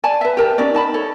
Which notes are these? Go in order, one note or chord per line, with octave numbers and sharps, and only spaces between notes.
D5 G#5 A5
B4 E5
G4 A#4 A5
C#4 D#4 A#4 D5
D#4 A5 B5
A4 C#5